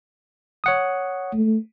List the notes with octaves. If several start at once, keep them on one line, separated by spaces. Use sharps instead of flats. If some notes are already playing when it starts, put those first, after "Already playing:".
C#5 F#5 D#6
A3